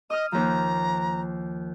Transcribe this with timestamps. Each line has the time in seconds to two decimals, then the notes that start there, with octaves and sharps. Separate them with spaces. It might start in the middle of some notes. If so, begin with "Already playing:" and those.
0.10 D#5 D#6 F6
0.32 D#2 F3 A#5